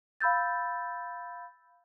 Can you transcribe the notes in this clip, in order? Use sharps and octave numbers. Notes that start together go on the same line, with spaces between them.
F5 B5 E6 G6 A6